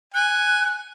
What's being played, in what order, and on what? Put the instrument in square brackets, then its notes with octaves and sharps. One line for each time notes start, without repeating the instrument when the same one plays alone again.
[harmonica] G#5 [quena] F#6